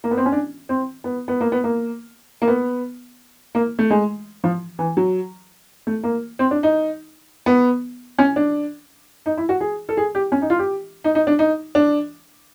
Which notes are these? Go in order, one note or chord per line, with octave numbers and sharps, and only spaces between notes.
A#3
B3
C4
C#4
D4
C4
B3
B3
A#3
B3
A#3
A#3
B3
A#3
A3
G#3
F3
E3
F#3
A3
A#3
C4
D4
D#4
B3
C#4
D4
D#4
E4
F#4
G#4
A4
G#4
G4
C#4
D#4
F4
G4
D#4
D#4
D4
D#4
D4